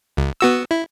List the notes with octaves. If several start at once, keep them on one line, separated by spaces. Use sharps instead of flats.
C#2
B3 F#4 E6
E4